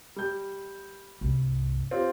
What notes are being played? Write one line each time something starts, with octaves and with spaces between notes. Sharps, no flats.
G3 G6
C2 G2
C4 F4 G4